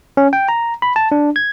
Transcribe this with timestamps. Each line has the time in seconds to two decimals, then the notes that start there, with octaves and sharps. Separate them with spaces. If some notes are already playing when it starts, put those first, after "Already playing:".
0.17 C#4
0.33 G5
0.49 A#5
0.82 B5
0.96 A5
1.12 D4
1.36 G#6